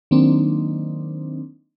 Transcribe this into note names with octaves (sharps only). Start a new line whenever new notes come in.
D#3 F#3 A#3 C4 D4 D#4